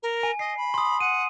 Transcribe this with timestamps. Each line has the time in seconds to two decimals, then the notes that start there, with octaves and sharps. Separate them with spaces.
0.03 A#4
0.23 G#5
0.39 D#5 C7
0.57 B5
0.74 C6 D#6
1.00 F#5 D#7